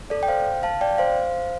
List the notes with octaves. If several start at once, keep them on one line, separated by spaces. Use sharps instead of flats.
A4 D5
G5
C5 F5
F5 A5
D5 G5
C5 F5